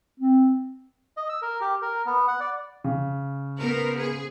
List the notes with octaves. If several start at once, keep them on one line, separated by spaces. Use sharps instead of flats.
C4
D#5
E6
A#4
G4
A#4
B3
F#5
D5
C#3
B3 A#4 C5
G#4